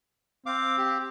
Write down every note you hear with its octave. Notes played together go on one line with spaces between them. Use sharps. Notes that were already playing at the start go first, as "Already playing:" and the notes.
C4 F5 D6
G4